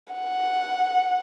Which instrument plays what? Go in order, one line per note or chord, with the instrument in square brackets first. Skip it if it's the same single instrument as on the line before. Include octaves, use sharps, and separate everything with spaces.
[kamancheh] F#5